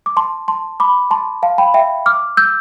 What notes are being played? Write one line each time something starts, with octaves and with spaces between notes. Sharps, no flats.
D6
A5 C6
A5 C6
B5 D6
A5 C6
F5 A5
G5 B5
E5 G5
D6 F6
E6 G6